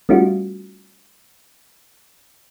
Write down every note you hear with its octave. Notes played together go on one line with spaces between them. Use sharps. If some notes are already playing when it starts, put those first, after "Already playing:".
G3 A3 C#4 D#4 F4 F#4